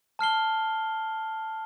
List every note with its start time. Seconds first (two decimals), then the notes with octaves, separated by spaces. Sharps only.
0.19 A5 F6 C7 G7